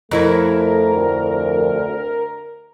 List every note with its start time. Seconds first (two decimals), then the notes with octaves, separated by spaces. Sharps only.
0.11 F2 A3 E4 A#4 C#5
0.94 D2